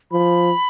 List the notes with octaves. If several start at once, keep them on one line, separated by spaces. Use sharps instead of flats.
F3 B5